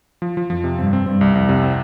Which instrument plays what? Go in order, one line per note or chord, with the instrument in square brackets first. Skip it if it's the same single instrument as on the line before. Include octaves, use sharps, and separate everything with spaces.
[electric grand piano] F3
F3
[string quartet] F2 [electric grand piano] F3
[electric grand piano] C3
[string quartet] G2 [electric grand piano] C4
[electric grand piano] C4
[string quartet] G2 [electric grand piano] C4
[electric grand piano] C2
[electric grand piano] C2 [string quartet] F2
[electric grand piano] C3
C4